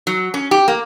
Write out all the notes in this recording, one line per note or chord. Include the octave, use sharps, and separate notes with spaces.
F#3
C#4
G4
A#3